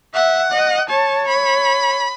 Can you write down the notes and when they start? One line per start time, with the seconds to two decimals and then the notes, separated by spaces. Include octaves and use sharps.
0.14 E5 F#5
0.52 D#5
0.90 C#5 A5
1.28 B5